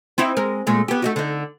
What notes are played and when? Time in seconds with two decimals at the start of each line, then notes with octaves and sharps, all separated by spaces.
0.18 C4 D#4 E4
0.37 G#3 A#4
0.67 A#2 G#3 A3
0.88 B3 G4
1.02 A3 D#4 F#4
1.16 D3 D#4